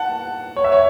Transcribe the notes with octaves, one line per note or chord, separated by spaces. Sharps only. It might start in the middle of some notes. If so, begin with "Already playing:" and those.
Already playing: F#5 A5
C#5
E5
C#5